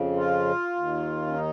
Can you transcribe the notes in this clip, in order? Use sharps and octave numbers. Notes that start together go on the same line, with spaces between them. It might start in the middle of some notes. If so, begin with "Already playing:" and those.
Already playing: F2 C#3
F4
D#2 D#3
C#4
D#4